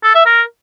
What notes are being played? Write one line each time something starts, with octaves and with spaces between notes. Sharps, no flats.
A4
E5
A#4